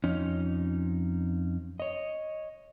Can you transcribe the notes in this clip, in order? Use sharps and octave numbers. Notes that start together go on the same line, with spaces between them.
F2 C#4 D#4
C#5 D#5